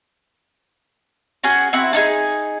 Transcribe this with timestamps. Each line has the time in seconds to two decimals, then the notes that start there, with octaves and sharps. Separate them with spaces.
1.44 C#4 F#4 G#4
1.73 C4 E4 F#4
1.93 D4 D#4 G#4